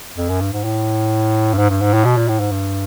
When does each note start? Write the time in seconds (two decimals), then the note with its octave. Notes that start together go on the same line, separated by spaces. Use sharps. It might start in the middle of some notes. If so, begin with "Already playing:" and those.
0.17 F2
0.29 F#2
0.41 G2
0.53 G#2
0.64 A2
1.54 G2
1.58 G#2
1.70 G2
1.81 G#2
1.94 A2
2.05 B2
2.17 A#2
2.28 A2
2.40 G#2
2.52 G2